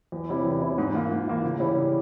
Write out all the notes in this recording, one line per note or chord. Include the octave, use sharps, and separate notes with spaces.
E2
C3 G3 C#4 E4
E2
C3 G3 C#4 E4
G#2
E3 A#3 F4
G#2
E3 A#3 F4
C#3
E3 G3 C#4 E4
C#3